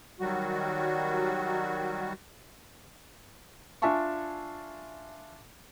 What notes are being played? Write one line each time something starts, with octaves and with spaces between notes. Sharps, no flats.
D#3 F#3 G3 F#4
D4 F4 E5 G#5 A5 C#6